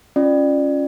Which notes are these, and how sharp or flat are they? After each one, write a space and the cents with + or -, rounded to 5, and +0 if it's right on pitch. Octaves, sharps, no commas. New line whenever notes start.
C#4 +0 F4 +0 D5 +25